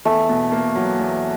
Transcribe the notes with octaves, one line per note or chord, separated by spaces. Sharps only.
E2 A3
B2
A#3
F#3
E2